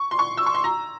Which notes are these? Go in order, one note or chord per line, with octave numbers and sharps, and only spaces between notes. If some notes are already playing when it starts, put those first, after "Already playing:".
Already playing: C#6
C6
C#6
E6
C#6
C6
A#5